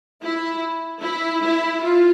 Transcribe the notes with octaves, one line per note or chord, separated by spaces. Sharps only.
E4
E4
E4
F4